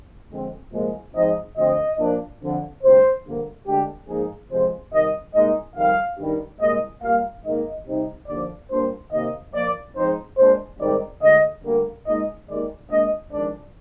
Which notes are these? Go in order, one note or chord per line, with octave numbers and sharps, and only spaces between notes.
F2 D3 G#3 C4
C2 A#2 F3 G#3
G#2 F3 C4 D#4 D#5
D2 D3 F3 C4 D#5
A#2 F3 A#3 D4
F2 D3 F3
D2 C3 G3 C5
G2 D3 F3 A#3
D2 D3 G#3 D4 G4
G#2 F3 A#3 D#4 G#4
F2 C3 F3 G#3 C5
C3 D#3 G3 D#5
C2 A#2 G#3 D#4 D#5
F2 D#3 G3 F5
G2 D#3 G3
C2 A#2 G#3 D#5
A#2 G3 A#3 F5
G#2 D#3 A#3 D#5
C3 G3 C4 D#4
D#2 D3 F3 D5
A#2 G3 D4 C5
C3 D#3 A#3 D#5
A#2 F3 A#3 D5
G#2 F3 C4 D#4 C5
A#2 G#3 D4 C5
G#2 D#3 G3 C4 D#4 D5
D2 D3 G#3 D#5
D2 D3 G3 A#3
A#2 G#3 D#4 D#5
D#2 D#3 G#3 D5
A#2 G#3 D4 D#5
F2 D#3 G#3 D4 D5